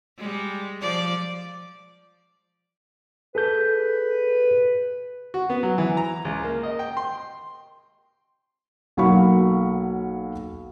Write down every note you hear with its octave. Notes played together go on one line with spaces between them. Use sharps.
G3 G#3
F3 D5
G#4 A4 B4 G6
F#4
B3
F#3
E3
A#5
C#2
A#3
D#5
G5
C6
B1 F#3 A#3 F5 B5 C#6